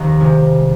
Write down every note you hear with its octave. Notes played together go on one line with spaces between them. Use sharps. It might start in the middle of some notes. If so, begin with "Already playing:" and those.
Already playing: F1 D#2 D#3 G3 A#5
C3 F3 G#3